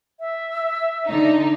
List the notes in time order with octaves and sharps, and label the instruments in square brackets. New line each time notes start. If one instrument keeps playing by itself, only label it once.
[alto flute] E5
[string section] D3 D#4